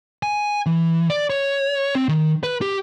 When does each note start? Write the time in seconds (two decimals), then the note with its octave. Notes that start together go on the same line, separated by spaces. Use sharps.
0.23 G#5
0.66 E3
1.10 D5
1.30 C#5
1.95 C4
2.09 D#3
2.43 B4
2.62 G4